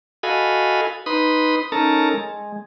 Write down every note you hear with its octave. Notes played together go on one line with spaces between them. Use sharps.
F#4 A4 D#5 F5 G#5 B5
D#4 B4 B5 C6 D#6
C#4 D#4 A4 A#4 A5 A#5
G#3